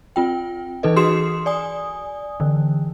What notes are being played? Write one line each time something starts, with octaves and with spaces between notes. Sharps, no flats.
C4 F4 G5
E3 D#4 A4 B4 D#5
F#4 G#4 C6 D#6 C7 E7
D5 G#5 D#6
D3 E3